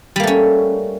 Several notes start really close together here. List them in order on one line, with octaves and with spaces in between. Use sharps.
G3 A#3 A3 C#4